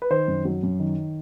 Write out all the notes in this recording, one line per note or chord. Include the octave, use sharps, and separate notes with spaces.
B4
D#3 C5
F#2
F#3
F#2
D#3